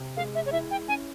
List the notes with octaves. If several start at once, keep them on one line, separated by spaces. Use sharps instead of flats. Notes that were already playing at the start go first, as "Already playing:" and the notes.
Already playing: C3
G#3 F5
E5
C#5
E4 E5
G5
C#4 G#5